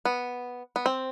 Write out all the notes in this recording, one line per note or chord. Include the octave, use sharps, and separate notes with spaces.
B3
B3
C4